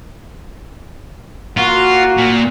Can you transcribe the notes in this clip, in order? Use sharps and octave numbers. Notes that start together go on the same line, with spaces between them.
A#3 F4 F#4
A#2